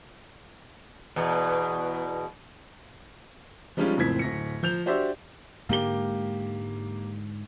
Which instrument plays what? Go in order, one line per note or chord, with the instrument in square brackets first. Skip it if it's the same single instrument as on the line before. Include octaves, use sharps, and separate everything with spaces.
[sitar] E2 B2
[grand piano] F3 G3 G#3 C#4 D#4 F4
F#1 F2 A2 C4 G#6 B6
D1 A#6 C#7
F3 G6 F7
D4 F#4 G4 C5 D5 E5
[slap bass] G#2 D3 G#3 [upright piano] A#3 G4 G7